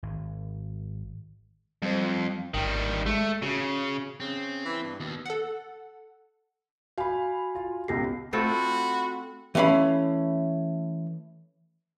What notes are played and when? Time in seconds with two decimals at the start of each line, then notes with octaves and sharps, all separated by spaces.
0.03 G#1
1.82 F2 G3 C5
2.54 G#1 D#3 G3 G5
3.06 G#3 A3
3.42 C#3 F#4
4.20 C#3 C4
4.65 E3
4.84 G2
5.00 D#2 B2
5.26 A4 F#5
6.98 F#4 F5 G#5 B5
7.55 F4
7.88 C#2 B2 F4 G4 A#6 C7
8.33 A3 C4 F4 F#4 B5
9.55 E3 A3 C#4 F5 B5